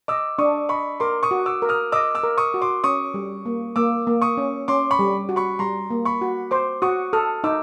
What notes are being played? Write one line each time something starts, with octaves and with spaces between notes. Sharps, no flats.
D#5 D6 E6
D4 C#6 D#6
D#5 B5 C#6
A#4 C6 D6
C#6 D#6
F#4
D6 E6
A#4
D#6 F6
D#5 D6 E6
D6 E6
A#4
C#6 D#6
F#4
C6 D6
C#4 C#6 D#6
G3
A#3
A#3 D6 E6
A#3
C#6 D#6
C#4
C#4 C6 D6
B5 C#6
G3
F#4
B5 C#6
G3 A#5 C6
A#3
B5 C#6
F#4
C5 C6 D6
F#4 C#6 D#6
A4 D#6 F6
D#4 D6 E6